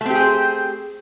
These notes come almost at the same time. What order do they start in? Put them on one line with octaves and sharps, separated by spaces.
A3 C4 G4 G#4 C5